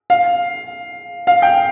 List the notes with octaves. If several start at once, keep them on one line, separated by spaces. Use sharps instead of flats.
F5
F5
G5